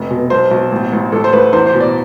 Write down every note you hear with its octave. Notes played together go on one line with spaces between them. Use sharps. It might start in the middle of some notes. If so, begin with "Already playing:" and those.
Already playing: F1
B2
B1 C5
B1
A1
A1
A1 A4
C5
A1 B4
E2 C5
C5
B2
D5